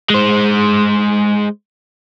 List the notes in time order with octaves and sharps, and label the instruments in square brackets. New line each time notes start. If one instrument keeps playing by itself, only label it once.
[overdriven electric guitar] G#3 C5